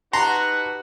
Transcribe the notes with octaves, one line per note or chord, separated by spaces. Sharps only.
D#4 F#4 G4 B4 A5 A#5 C6